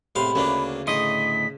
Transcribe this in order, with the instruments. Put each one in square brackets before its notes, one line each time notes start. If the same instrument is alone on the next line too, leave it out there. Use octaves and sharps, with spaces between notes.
[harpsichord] A2 F5 C6 [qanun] C3 G#3 B3 [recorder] B5
[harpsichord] D2 A#3 D4 [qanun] C#3 A3 C#4
[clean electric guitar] D2 A2 D#5 [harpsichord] G#4 C6 [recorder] B6